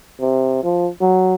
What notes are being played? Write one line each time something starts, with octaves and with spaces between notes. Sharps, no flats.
C3
F3
F#3